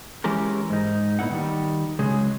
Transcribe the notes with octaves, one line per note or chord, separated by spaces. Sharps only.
E3 G#3 C#4 G4 A#4
G#2 D#4
A#2 B3 E4 F#5
D#3 G3
C#3 F#3 G#3 G#4